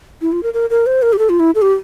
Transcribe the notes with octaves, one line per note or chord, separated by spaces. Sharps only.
E4
F4
A#4
A#4
A#4
C5
A#4
G4
A4
F4
E4
A4
G4